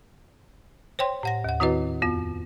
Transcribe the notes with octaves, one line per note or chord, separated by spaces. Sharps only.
C5 C#5 G5 C6
A2 F#5 A#6
D#2 F#5
D#3 C4 E4 F#4 B4 D#5
F2 B3 F4